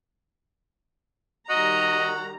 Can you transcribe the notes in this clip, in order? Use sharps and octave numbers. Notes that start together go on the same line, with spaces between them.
D#3 G3 F#4 D#5 A#5